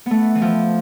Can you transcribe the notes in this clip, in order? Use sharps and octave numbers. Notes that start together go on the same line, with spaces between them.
A3 B3
E3
F3